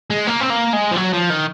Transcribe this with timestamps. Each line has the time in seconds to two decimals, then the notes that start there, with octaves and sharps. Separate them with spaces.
0.10 G#3
0.27 A#3
0.41 C4
0.50 A#3
0.73 G#3
0.91 F3
0.96 F#3
1.13 F3
1.30 D#3